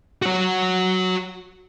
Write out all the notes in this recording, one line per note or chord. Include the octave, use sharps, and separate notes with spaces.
F#4 C#5